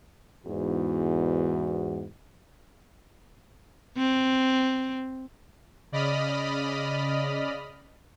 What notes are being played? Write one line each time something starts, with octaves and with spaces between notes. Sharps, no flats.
E2 G#2 F#4
C4
C#3 D5 D#5 B5 D#6 F6